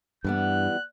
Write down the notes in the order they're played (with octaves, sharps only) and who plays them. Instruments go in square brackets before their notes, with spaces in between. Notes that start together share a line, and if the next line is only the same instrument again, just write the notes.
[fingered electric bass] G2 [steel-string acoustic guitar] E3 G3 B3 [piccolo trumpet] F#6